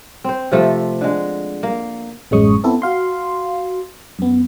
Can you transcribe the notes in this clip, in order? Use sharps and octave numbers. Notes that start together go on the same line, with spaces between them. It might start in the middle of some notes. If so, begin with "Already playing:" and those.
C4 C5
C3 F3 A3 A4
D3 G#3
A#3
A1 F#2 G#3 C#4 C#6 D#6
B3 C4 E4 A4
F#4 F5 C6
F#2 B3